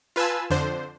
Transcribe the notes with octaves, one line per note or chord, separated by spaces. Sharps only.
F4 B4 G#5 A5 E6
F2 D3 D4 C5